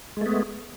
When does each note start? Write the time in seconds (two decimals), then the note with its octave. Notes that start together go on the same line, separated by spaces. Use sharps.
0.17 G#3
0.21 A3
0.26 B3